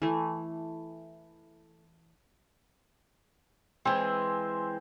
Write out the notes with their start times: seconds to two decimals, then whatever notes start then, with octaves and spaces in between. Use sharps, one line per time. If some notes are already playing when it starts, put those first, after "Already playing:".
0.02 E3 A3
3.85 E3 G#3 C4 C5 G#5